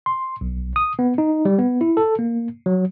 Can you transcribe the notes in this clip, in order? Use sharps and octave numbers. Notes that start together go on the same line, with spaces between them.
C6
B1
D#6
B3
D#4
G3
B3
E4
A4
A#3
F#3